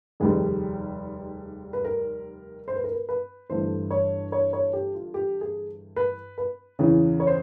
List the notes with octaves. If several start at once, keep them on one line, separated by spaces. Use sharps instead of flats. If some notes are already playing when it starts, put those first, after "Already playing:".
F1 D#2 D#3 G3 G#4
B4
A#4
C5
B4
A#4
B4
B4
G1 G2 E3 A3 C5
C#5
C#5
C#5
G4
F4
G4
G#4
B4
B4
E2 C#3 E3
C#5
C5